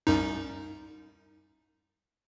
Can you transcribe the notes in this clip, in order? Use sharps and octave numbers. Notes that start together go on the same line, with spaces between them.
C2 F#2 D#4